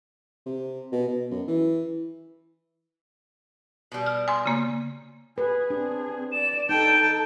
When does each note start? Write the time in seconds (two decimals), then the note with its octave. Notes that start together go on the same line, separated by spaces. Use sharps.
0.46 C3
0.92 B2
1.08 B2
1.31 F#2
1.48 E3
3.92 B2 G3
4.06 F6
4.28 G#5 C6
4.46 C#3 A#3
5.38 G#4 B4
5.70 C4 D4 G#4
6.32 D5 E7
6.69 D#4 A4 G5 A5